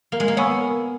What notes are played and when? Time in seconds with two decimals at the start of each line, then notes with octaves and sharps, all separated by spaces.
0.12 A#3 A#4
0.20 G#3
0.28 A#3
0.37 B3 C#5 G#5 C#6 E6
0.61 A#4